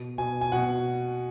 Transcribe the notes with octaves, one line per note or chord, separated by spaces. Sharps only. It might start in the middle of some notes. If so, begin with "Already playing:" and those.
Already playing: B2
B2 G#5
G#5
B2 F#5